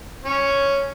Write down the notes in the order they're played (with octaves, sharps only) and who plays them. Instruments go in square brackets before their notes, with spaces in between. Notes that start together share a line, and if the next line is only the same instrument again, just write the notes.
[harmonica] C#4 C#5